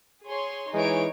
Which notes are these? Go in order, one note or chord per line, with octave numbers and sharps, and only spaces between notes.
G#4 C#5 C6
E3 G#3 D#4 C#5 D7